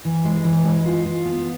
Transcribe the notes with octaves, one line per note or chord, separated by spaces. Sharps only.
E3
G#3
E3
G#3
F4
F4
B3